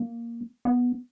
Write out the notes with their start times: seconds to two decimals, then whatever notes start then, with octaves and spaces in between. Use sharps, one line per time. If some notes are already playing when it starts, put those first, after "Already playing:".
Already playing: A#3
0.65 B3